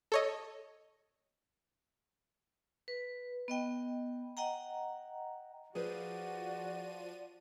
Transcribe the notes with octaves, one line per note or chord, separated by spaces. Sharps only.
A4 C#5 D#5
B4
B3 D#5 G5
D#5 F#5 G5 A#5
F3 F#4 G#4 B4 C5 D5 D#7